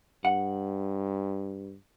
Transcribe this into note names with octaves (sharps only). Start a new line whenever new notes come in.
G2 F#5